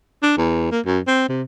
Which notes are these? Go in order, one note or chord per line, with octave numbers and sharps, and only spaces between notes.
D4
E2
A#3
F#2
C4
C3